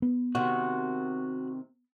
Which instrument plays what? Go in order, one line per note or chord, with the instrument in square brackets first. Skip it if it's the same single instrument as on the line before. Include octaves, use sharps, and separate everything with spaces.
[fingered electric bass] B3
[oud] C3 D#3 [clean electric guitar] F#4